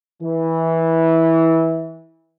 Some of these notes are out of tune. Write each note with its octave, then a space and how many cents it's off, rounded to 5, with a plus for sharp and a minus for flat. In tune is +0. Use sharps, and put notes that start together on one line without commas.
E3 -15